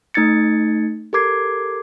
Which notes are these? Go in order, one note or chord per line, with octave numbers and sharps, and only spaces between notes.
A3 D#4 G#6 A6 C#7
G4 A4 A#4 D6 G#6 C7